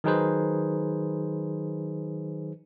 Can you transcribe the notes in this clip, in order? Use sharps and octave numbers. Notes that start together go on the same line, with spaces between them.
D#3 F#3 D#4 G#4 B4 C5